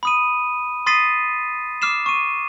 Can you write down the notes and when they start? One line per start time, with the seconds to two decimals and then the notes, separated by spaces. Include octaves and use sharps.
0.03 B5 D#6 D#7
0.86 C6 D#6 A6 B6 C7 D#7
1.82 D6 F6 C7 E7
2.06 C#6 D#7